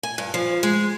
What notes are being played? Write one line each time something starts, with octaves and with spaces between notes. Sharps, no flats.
G#5
G2
F3
G#3